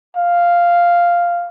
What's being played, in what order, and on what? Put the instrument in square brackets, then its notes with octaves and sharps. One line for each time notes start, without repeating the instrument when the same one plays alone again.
[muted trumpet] F5